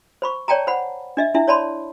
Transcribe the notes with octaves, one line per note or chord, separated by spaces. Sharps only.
C5 B5 C#6
C#5 D5 G5 A5 A#5
C5 F#5 B5
D4 D#5 E5
D4 E4 E5
C#5 D5 A5 B5 C6